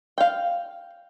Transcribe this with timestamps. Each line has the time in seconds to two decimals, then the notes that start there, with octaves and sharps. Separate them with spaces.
0.18 F5 G5